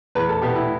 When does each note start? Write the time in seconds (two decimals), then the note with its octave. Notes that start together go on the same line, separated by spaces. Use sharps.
0.15 E2 B4
0.29 A4
0.42 B2 B3 G4
0.55 E4